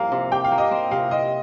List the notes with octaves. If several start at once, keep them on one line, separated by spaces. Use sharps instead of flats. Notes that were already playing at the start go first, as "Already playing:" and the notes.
Already playing: F3 G3 A#3 F5
C3
G4 G5
F5
A#3
D#5
C4
C3 F5
C4 D#5